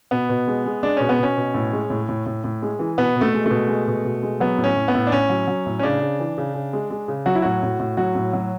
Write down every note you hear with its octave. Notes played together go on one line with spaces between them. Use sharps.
B2 B3
B2
G#3
G#3
G#3 D4
B2 C#4
B3
B2 C#4
B2
A2
G#3
A2
A2
A2
A2
G#3
E3
B2 B3
B2
A3
G#3
B2 A3
G#3
B2
B2
G#3
F#3 B3
A2
C#4
A2
B3
A2
D4
A2 C#4
F#3
F#3
A2
C#4
C#3 D4
C#3
E3
C#3
C#3
G#3
G#3
C#3
F#3 F#4
E4
A2 F#4
A2
A2
F#3 F#4
A2
F#3